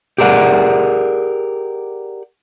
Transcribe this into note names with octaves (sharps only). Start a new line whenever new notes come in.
G4 G#4 A#4 D5 F#5